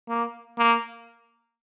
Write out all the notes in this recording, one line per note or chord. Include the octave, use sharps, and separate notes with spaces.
A#3
A#3